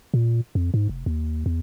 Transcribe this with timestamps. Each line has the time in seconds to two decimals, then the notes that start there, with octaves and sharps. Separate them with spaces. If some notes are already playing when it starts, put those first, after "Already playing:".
0.14 A#2
0.55 F2
0.74 G#2
0.89 F1
1.06 D#2
1.46 E2